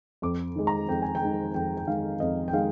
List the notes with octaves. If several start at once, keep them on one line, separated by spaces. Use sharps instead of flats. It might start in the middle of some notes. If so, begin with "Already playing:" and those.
F2 D6
D#3 G#3
A#5
F2 G5
G#5
G5
D#3 G#3
F2 G5
G5
D#3 G#3 F5
F2 D#5
G5
D#3 G#3 F5